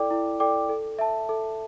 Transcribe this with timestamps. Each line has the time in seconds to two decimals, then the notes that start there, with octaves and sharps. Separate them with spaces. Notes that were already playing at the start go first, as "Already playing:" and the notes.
Already playing: E4 A4 D5 G5 D6
0.11 E4
0.40 A4 D5 G5 D6
0.69 A4
0.99 E5 A5
1.29 A4